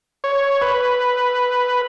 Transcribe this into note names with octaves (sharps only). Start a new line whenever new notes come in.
C#5
B4